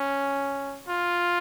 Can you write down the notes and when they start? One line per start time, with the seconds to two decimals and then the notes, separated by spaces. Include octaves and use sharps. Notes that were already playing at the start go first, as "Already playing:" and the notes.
Already playing: C#4
0.89 F4